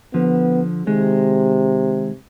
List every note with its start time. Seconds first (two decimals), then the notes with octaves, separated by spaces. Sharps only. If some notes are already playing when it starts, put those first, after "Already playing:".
0.14 D3 F3 B3
0.87 C3 D#3 G#3